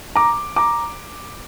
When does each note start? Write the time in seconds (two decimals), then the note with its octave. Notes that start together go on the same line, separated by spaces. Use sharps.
0.16 A#5 D6
0.56 A#5 D6